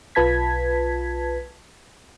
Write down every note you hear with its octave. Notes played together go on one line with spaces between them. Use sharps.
B1 F4 B4 A5 G#6 B6